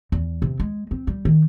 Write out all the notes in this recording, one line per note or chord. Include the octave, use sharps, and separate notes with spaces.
E2
C3
G#3
C4
G3
D#3